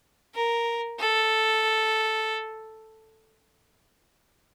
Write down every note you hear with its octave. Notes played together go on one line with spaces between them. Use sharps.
A#4
A4